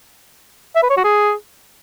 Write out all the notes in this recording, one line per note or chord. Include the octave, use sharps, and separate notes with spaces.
E5
B4
C#5
F#4
G#4